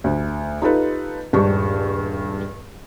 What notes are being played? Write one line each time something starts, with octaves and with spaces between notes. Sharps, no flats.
D2
D#4 F4 G4 A4 B4
D#1 G2 G#3 D4 G4 C#6